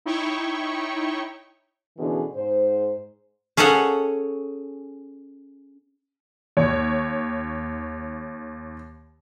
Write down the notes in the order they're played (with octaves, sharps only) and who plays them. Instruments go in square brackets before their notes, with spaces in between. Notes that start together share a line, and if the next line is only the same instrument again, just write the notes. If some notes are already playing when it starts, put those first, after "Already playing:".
[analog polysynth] D#4 E4 C#5 G5 C#6
[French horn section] B2 D3 E3 C#4 G#4
G#2 C5
[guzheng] C#4 G#4 A4 C#5 F#5
[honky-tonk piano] D#2 C#5